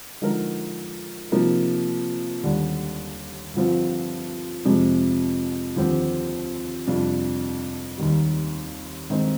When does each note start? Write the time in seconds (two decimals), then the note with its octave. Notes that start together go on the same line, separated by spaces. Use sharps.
0.21 D3 F3 G#3 D#4 A#4
1.32 C3 F3 A#3 D#4 A#4
2.43 D#2 D3 G3 D4
3.54 G2 D3 F3 C4 F4
4.65 F2 C3 F3 G#3
5.76 D#2 D3 F3 C4 G4
6.87 F2 C3 G3 D4 F4
7.98 D#2 D#3 G3
9.09 G2 D#3 G#3 C4 D#4